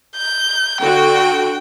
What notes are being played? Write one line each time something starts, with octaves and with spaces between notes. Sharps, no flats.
G6
D3 F#4 G5